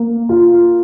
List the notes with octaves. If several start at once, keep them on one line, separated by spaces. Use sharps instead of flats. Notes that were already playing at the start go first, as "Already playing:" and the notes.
Already playing: A#3
F4